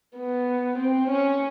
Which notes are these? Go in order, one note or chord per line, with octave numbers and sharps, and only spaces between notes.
B3
C4
C#4